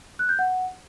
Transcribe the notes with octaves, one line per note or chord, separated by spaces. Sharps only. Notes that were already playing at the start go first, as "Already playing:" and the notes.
F#6
G6
F#5